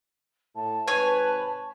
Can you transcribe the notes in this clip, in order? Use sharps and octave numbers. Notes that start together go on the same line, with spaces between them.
A2 A5
G#2 C3 B4 C#5 G#5